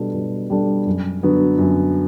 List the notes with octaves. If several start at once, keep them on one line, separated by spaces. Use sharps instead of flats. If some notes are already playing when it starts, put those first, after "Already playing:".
Already playing: B2 G3 D4 A4
B2
G3 D4 A4
F#2
D3 F#3 B3
F#2